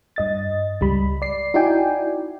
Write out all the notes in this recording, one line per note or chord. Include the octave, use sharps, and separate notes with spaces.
G2 D#5 A6
C#2 G3 B5
D5 C7
D#4 E4 F#4 D5 G5 G#5